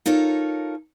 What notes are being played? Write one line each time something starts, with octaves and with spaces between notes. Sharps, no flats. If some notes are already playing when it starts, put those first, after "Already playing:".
D#4 F4 A4 A#4 C#5